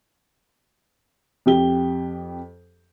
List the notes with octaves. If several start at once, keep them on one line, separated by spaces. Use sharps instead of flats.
F2 G4 G7